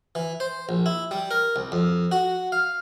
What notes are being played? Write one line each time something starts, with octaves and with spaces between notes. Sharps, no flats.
E3
C5
A#1
E4
G3
A#4
C2
F2
F#4
F5